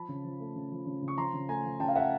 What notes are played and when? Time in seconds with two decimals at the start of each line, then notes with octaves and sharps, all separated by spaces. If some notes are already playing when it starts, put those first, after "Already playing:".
Already playing: F3 A5 B5
0.09 C#3
0.24 F3
0.40 A3
0.56 C#3
0.72 F3
0.86 C#3
1.02 C#3
1.08 C#6
1.18 F3 A#5 C6
1.33 C#3
1.49 A3 G#5 A#5
1.64 F3
1.80 C#3 G5 A5
1.88 F5
1.95 A3 E5 F#5